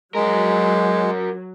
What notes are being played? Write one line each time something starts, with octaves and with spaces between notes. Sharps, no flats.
F#3 G#3 F#4 A#4